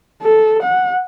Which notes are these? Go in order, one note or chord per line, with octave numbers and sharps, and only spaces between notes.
A4
F#5